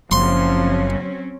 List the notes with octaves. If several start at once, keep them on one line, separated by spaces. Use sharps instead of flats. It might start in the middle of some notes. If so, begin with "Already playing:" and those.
F#1 F3 F#3 C4 C#4 C6